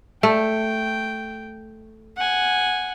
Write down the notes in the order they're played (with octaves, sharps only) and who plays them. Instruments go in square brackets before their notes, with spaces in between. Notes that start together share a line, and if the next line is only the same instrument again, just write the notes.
[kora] A3 [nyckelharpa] G5
[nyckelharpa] F#5 G#5